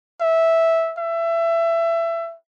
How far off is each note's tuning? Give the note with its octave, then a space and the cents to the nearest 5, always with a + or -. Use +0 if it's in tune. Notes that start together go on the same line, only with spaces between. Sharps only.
E5 -5
E5 +20